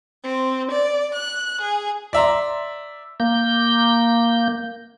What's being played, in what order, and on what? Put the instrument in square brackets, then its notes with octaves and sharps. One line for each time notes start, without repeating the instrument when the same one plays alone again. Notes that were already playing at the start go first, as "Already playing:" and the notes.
[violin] C4
D5
F#6
G#4
[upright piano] D5 E5 A#5 C6
[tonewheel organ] A#3 G6